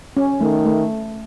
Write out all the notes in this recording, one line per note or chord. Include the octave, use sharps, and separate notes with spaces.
C#4
D#3 A3
A3